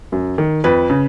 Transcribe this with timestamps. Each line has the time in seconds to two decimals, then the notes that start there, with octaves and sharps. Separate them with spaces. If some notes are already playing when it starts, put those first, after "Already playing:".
0.12 F#2
0.38 D#3
0.64 F2 B4
0.90 C#3